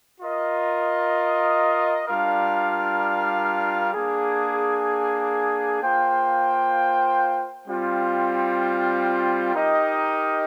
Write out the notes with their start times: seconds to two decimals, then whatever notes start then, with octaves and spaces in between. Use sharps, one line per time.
0.21 F4 A#4 D#5
2.07 G3 D4 F4 A#4 F5
3.94 A#3 D4 G#4
5.81 A#3 F4 C5 G5
7.67 G3 C4 F4
9.54 D#4 G4 A#4 D#5